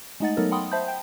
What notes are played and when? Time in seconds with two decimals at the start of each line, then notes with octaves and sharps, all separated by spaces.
0.20 G#3 A3 D#4 D#5 F#5 A6
0.37 F#3 A3 B3 D#4 A4 A#4
0.51 F#5 G5 B5 C6 D#6
0.72 C5 E5 A5 B5 G6
0.88 G5